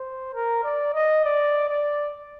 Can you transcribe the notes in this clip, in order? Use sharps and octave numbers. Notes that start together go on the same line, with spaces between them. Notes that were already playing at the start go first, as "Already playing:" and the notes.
Already playing: C5
A#4
D5
D#5
D5
D5